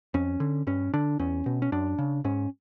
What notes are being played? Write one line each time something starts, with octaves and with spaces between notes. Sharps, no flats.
F2 C#4
D3
G2 C#4
D3 D4
E2 C#4
B2
C#4
F#2 D4
C#3
G#2 C#4